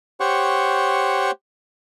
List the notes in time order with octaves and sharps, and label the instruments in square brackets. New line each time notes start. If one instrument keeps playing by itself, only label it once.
[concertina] G4 C5 C#5 F#5 C#6